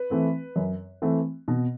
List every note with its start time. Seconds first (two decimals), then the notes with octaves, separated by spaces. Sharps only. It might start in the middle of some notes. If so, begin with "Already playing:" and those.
Already playing: B4
0.10 E3 A3 C4
0.56 F#2
1.02 E3 A3 C4
1.48 B2